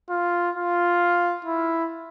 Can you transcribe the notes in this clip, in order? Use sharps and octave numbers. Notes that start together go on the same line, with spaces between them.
F4
F4
E4